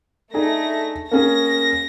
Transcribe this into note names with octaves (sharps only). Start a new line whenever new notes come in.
A3 D4 D#4 G#4 A#6
A#3 C#4 G#4 A#6